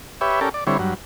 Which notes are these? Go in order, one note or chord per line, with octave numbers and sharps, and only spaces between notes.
G4 B4 C#5 E5
C#4 G4 A4 A#4 D5
D5
D3 G3 C4 E4 C#5
G2 F#3